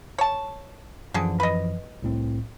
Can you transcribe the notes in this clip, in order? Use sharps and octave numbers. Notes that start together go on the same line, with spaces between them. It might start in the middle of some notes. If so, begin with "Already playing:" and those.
C#5 A5
F#2 D3 E3 F3 G#4
B4 D#5
C2 A2 C4